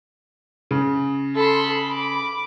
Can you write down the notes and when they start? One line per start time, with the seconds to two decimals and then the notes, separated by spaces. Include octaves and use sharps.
0.71 C#3
1.36 A4 B5 C6
1.91 D6